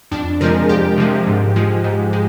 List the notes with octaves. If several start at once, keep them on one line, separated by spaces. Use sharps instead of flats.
F2 D4
C3 F3 G#3 A#4
F2 G4
C3 F3 G#3
G#2
F3 G#3
G#2
G#3